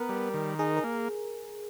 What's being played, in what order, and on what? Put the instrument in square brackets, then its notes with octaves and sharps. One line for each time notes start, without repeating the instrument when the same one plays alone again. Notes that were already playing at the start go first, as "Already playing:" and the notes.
Already playing: [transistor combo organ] B3 [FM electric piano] A#4
[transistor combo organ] G3
D#3
[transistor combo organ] D#4 [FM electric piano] G#4
[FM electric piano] A#4
[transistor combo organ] A#3